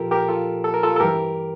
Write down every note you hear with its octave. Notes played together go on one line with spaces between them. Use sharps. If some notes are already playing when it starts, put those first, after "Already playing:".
Already playing: A#2 F3 F4 G4 A4 A#4
G4 A#4
F4 A4
A4
A#4
F4 A4
A4
G2 E3 G3 G4 A#4